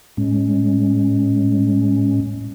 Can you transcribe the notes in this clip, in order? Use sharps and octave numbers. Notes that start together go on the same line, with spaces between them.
A2 G#3 C#4